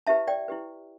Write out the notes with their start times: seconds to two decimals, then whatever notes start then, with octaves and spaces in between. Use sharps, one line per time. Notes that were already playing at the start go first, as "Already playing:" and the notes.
0.07 E4 G4 B4 E5 A5
0.28 D5 G5
0.48 E4 G4 B4